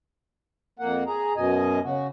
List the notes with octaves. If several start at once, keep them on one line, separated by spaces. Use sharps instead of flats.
F2 A#3 F#5
G#4 A#5
F#2 B2 D#5 G#5
C#3 F#4